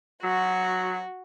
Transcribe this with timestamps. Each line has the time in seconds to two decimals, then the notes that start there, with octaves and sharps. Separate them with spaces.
0.24 F#3 F#4